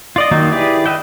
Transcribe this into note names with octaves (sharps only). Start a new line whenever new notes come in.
F4 D5 D#5
D#3 F#3 A#3 D#4 F4
E4 G4 G#4 B4 D5
B4 D#5 E5 G5